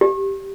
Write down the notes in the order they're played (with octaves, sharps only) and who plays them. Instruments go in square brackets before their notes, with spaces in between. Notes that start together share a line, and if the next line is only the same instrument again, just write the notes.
[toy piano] G4